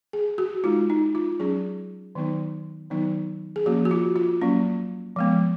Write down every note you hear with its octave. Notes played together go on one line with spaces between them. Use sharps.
G#4
F#4
G#3 D#4 F4
D#4
F4
F#3 C#4 G#4
D#3 F#3 B3 D#4
D#3 F#3 B3 D#4
G#4
F3 A#3 C#4 F#4
F#4
F4
F4
F#3 A#3 C#4
F3 G#3 B3